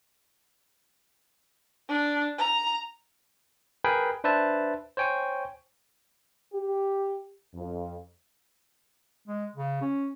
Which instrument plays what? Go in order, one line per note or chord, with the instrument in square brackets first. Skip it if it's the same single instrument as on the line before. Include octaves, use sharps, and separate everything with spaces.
[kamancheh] D4
A#5
[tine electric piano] G#4 A#4 B4 G5 G#5 B5
D4 B4 C5 E5 A5
C5 C#5 G5 G#5 C#6
[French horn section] G4
F2
[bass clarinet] G#3
C#3
C#4